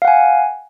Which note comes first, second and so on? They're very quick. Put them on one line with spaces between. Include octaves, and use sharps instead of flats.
F5 F#5 G#5